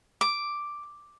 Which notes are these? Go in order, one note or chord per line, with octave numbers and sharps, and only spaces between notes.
D6